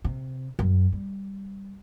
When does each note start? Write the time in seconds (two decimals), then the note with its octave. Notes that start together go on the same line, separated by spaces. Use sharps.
0.04 C3
0.59 F#2
0.93 G3